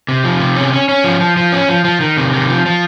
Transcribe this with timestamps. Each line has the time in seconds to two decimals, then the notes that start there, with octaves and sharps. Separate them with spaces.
0.08 C3
0.24 F3
0.40 C3
0.56 C#4
0.73 C#4
0.89 C#4
1.04 F3
1.21 F3
1.37 F3
1.52 C#4
1.69 F3
1.85 F3
2.01 D#3
2.17 C3
2.33 D#3
2.49 F3
2.66 F3